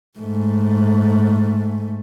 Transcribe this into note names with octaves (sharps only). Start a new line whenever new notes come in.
G#2 A3